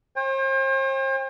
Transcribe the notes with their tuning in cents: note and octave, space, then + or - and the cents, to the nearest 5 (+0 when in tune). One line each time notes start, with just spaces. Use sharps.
C5 +45 G5 +35